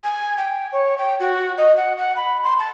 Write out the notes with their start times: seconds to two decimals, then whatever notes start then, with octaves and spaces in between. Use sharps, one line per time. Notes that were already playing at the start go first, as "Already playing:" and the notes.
0.04 G#5
0.37 G5
0.72 C#5
0.98 G5
1.20 F#4
1.58 D#5
1.77 F#5
1.98 F#5
2.16 B5
2.43 C6
2.59 A5